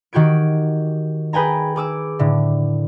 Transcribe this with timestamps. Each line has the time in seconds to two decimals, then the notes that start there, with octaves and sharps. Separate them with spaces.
0.13 D#3 F#4 G4 G#6 D7
1.33 G#4 B4 G5 G#5 A#5
1.76 G#4 D6 E6
2.19 A2 D3